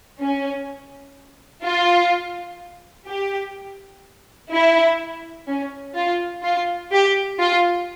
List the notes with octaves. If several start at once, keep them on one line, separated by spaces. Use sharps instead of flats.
C#4
F4
G4
E4
C#4
F4
F4
G4
F4